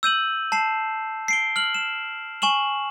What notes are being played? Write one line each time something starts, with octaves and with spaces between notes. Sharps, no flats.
E6 G6 D#7 F#7
A5 C7 E7
C7 D7 G7
F6 F#7
E7
G#5 C#6 E7 F#7